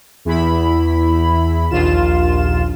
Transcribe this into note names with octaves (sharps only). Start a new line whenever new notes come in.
E2 E4 B5
A#1 D#2 F4 E7